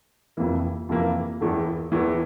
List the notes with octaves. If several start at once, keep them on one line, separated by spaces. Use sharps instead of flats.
F1 F2 E3 A#3
F1 F2 E3 A#3
E1 E2 E3
E1 E2 E3